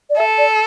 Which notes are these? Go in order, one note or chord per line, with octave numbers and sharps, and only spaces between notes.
D5
A4 E5
D5